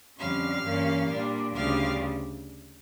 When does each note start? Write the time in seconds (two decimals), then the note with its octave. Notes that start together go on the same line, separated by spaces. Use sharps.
0.19 F2 D3 G3 C#4 F5
0.64 G2 E3 A#3 C#4
1.09 A#2 G3 D4
1.55 D2 C#3 G3 D4 F5